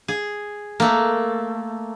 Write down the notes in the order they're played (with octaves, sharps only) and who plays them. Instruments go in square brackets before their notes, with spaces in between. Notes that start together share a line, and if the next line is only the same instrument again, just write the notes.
[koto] G#4
A3 A#3